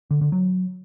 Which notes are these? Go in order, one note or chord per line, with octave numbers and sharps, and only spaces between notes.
D3
D3
F#3